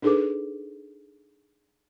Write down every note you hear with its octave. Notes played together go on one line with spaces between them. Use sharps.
D4 D#4 G#4 A4 B4 D6